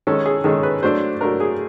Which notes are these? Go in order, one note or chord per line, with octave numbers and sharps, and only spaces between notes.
D#3 G#3 C#4 A4
G#4
D#3 G#3 C#4 A4
B4
F#3 A3 D4 C5
F#3 A3 D4 A#4
G#4